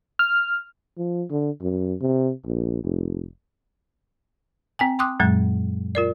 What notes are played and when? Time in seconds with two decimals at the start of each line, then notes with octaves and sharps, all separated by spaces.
0.19 F6
0.98 F3
1.31 D3
1.62 F#2
2.01 C3
2.46 A#1
2.84 F1
4.79 C4 G5 G#5
4.99 G5 C6 D6 D#6 F#6
5.20 F#2 A#2 F#3 G#3
5.95 F4 A#4 D5